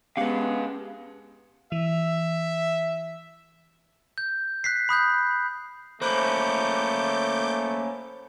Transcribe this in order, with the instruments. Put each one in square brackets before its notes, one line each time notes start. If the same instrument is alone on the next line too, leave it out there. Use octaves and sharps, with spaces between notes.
[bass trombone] G#3 [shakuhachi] B3 [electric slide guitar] C#4 G4 F#5 [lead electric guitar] B4 F5
[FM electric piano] E3 [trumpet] E5
[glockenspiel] G6
F#6 B6 C7
B5 D#6 F#6 G6
[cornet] A3 [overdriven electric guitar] A#3 C#4 [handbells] C5 B5 F#6 [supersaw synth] D6 G6